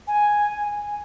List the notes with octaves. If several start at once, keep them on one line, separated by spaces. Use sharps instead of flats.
G#5